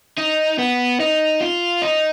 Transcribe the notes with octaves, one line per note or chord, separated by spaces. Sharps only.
D#4
B3
D#4
F4
D#4